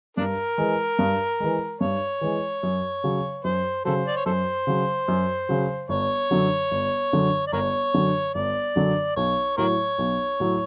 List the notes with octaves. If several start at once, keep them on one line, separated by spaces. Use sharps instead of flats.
G2 D4 A#4
E3 G#3
G2
E3 G#3
G2 C#5
E3 G#3
F#2
C#3 F#3
F#2 C5
C#3 F#3 A4 C5
D5
C#5
F#2 A4 C5
C#3 F#3
F#2
C#3 F#3
G1 C#5
F#2 D3 F#3
G1
F#2 D3 F#3
D5
G1 A#4 C#5
F#2 D3 F#3
G1 D5
F#2 D3 F#3
B1 C#5
A2 F#3 A#4 C#5
B1
A2 F#3